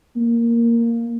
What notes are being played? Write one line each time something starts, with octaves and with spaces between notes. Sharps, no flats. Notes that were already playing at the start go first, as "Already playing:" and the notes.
A#3